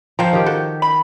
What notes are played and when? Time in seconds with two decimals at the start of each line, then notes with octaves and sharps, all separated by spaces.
0.19 F3 C5 G5 A#5
0.33 D#3 G4
0.46 F#4 A4
0.82 B5